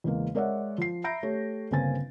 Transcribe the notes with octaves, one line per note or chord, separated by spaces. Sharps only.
E2 C#3 G#3 A#3
G#3 A#4 C#5 D5 E5 F#5
F3 C7
E5 A#5 B5 G6 A#6 D7
A3 G4 A4 C#5
G1 C#3 A#3 C4 G#5 A6